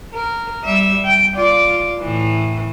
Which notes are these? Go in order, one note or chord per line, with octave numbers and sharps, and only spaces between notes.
A#4
G3 E5
G5
F4 D5
A2 E3